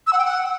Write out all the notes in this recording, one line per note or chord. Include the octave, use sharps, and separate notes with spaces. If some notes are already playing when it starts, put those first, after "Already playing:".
E6
F#5
G5
F#5